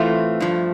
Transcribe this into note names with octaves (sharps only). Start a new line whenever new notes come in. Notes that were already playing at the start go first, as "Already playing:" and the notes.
Already playing: A2 E3 A3 C4 F4
G2 F3 A3